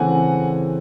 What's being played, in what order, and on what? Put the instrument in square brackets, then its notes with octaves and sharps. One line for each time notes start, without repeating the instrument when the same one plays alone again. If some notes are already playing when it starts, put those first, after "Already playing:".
Already playing: [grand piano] C#3 E3 A3 C4 F#5 G#5